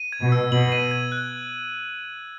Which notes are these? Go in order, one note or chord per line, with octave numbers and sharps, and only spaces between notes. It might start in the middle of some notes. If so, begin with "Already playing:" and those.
Already playing: D#7
G#6
B2
E6
B2 F#7
D#7
G#6
F#6